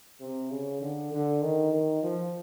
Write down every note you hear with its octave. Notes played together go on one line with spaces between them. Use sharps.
C3
C#3
D3
D3
D#3
D#3
F3